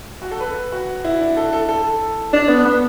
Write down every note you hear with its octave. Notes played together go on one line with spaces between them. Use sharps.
F#4
A4
B4
F#4
E4
D4
A4
A4
A4
D4
B3
B3